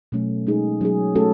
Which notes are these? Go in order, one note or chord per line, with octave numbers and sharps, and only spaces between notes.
B2 F#3 A3 C#4
G#3 D#4 G#4
F#3 C#4 G#4
A3 C#4 F#4 A4